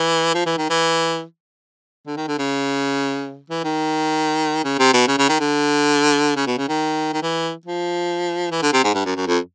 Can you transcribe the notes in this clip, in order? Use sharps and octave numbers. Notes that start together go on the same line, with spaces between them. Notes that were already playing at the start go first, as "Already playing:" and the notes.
Already playing: E3
F3
E3
D#3
E3
D3
D#3
D3
C#3
E3
D#3
C#3
C3
B2
C#3
C#3
D#3
D3
C#3
B2
C#3
D#3
D#3
E3
F3
E3
D3
C3
G#2
G2
F#2
F#2
F2